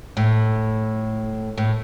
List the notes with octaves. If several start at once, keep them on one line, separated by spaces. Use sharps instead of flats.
A2
A2